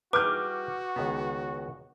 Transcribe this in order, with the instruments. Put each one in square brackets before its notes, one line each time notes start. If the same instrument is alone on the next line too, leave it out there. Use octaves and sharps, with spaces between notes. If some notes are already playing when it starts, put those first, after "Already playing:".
[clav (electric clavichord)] G3 E4 G#4 [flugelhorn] F#4 [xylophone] B4 [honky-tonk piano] D6 F6 G6
[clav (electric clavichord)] C#2 D#3 B3